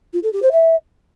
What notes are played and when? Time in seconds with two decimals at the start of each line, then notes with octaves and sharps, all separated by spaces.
0.13 F4
0.23 A4
0.32 G4
0.42 C5
0.52 E5